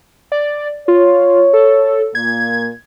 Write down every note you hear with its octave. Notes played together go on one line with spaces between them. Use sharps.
D5
F4 C#5
A4
A#2 A#3 G#6